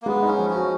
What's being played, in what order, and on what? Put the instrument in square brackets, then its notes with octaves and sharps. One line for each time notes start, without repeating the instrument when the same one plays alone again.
[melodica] A#3
[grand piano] G#3 [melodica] B3
[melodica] C#4 [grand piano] D#4
[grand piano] F3
[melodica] C#4 [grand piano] F#4